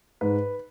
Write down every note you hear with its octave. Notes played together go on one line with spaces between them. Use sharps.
G#2 B4